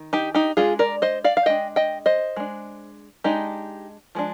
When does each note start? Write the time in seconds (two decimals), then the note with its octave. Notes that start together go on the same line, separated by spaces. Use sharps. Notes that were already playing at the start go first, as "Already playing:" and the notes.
Already playing: D#3
0.13 D#4 G4
0.35 D#4 G4
0.57 G#3 D4 F4 G#4
0.79 A#4 D5
1.02 C5 D#5
1.24 D5 F5
1.37 F5
1.46 G#3 D4 D#5 G5
1.76 D#5 G5
2.06 C5 D#5
2.36 G#3 D4
3.24 G#3 D4 D#4 G4
4.15 F3 G#3 D4